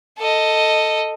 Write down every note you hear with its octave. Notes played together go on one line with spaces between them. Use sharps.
A4 D#5